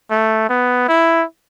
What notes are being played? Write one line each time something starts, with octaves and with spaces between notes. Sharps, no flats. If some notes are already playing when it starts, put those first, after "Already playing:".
A3
B3
E4